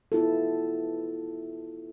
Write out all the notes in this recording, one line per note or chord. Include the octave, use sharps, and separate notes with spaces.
B3 E4 F4 A4